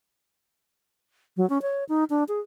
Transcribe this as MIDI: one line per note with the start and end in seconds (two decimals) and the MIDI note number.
1.37 1.48 54
1.50 1.61 61
1.62 1.84 73
1.89 2.04 63
2.10 2.24 62
2.28 2.40 68